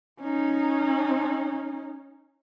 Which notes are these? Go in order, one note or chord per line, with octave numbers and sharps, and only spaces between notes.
C#4 D#4